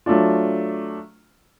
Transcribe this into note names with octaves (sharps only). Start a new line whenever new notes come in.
F#3 A3 D4 F4